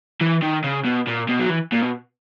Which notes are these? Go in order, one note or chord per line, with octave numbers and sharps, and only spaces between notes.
E3
D#3
C#3
B2
A#2
B2
F#3
E3
A#2
B2